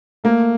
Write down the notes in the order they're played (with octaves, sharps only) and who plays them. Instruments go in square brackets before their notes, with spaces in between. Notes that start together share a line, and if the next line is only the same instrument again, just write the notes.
[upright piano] A3 A#3